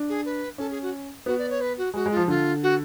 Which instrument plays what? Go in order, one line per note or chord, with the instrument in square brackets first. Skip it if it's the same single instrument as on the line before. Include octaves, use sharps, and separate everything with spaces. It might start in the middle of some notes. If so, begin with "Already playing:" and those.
Already playing: [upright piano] D4
[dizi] G#4
B4
[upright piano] C#4 [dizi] A4
[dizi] G#4
F#4
[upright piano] B3 [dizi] F#4
[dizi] D5
C#5
B4
F#4
[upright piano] G#3 [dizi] F#4
[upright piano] G#3
[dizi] F4
[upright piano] F3
[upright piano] D3 [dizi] F4
[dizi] F#4